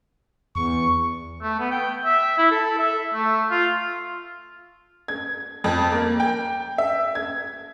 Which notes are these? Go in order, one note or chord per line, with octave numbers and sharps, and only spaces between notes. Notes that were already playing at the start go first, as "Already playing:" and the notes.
E2 C#6
A3
B3
G5
E5
E4
A4
E5
A3
F4
G#6
F2
A#3
G5
E5
G#6